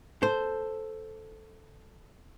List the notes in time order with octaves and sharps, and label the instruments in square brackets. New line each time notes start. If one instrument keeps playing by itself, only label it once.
[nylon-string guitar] A4 [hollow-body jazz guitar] C5